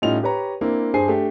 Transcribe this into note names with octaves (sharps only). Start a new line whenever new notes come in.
A2 G3 C#4 D#4 F4 F7
G4 B4 C#5 A#5
A#3 C4 D4 E4
G2 G#4 C5 G#5 C7
A3 D4 G4